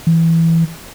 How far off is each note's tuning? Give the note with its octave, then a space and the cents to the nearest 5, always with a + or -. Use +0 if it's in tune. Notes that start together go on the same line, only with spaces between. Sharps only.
E3 +0